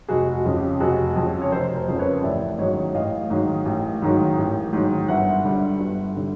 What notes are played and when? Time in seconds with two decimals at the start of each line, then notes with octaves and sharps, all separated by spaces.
0.08 F1 F#4 G#4
0.33 F#4
0.45 F2 C#3
0.56 G4
0.80 F1 F#4 G#4
1.16 F2 C#3
1.42 C#5
1.52 F1 A#4 C5
1.76 A#4 C5
1.88 F2 C#3
1.96 C5
1.99 B4 C#5
2.23 A1 D5 E5
2.58 G#2 D#3 F#3 C#5 D#5
2.94 A1 D#5 F5
3.30 G#2 D#3 F#3
3.66 A1
4.02 G#2 D#3 F#3
4.38 A1
4.73 G#2 D#3 F#3
5.08 G1 E5 F#5
5.44 G2 D3 G3
5.80 G1
6.16 D3 G3